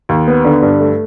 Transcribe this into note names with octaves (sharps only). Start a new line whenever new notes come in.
D#2
B3
D3
G2
A3